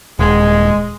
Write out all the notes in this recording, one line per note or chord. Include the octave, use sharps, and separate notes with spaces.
D#1 G#3